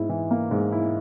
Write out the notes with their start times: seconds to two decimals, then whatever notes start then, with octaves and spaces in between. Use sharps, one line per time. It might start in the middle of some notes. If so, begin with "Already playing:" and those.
Already playing: G#2 E4
0.09 E3
0.31 A#3
0.51 G#2
0.72 E4